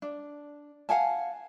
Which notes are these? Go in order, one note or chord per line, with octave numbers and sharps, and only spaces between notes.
D4
F5 F#5 G#5 A5